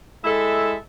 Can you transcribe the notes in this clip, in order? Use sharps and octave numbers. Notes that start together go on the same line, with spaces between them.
G#3 E4 A4 E5